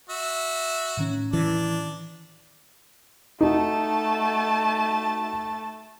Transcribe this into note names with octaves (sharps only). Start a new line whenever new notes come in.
F#4 E5
A2 D#3 C#4
E3 D4
A3 D#4 F#4 A5